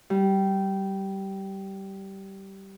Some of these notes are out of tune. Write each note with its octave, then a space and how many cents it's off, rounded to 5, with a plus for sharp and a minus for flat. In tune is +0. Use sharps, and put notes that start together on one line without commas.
G3 -15